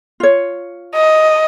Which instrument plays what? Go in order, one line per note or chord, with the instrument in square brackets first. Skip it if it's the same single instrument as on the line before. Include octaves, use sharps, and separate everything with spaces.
[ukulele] F4 C#5
[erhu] D#5